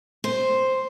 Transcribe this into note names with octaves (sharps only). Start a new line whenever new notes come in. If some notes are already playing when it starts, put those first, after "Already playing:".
C5